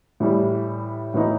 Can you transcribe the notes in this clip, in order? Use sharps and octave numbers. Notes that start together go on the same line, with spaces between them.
A2 E3 G3
A2 E3 B3 D#4 F#4